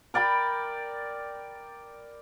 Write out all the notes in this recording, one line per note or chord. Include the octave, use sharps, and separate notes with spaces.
A#4 D5 G5 B5